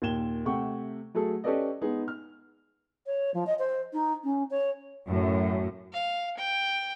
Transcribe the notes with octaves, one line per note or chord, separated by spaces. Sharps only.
D#2 A#2 G#6 E7 G7
C3 A3 F#5 G5 C#6
F#3 A3 G#4 A4
C#4 G4 A4 B4 D5 D#5
G#3 B3 D#4 G#4
F6
C#5
F3
D#5
C5
D#4
C#4
C#5
F#2 A2
F5
G5